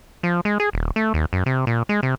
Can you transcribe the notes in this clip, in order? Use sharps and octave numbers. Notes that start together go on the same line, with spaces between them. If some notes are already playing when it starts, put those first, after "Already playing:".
F3
G#3
G#4
D#1
A3
D#2
F#2
C3
A#2
G#3
C3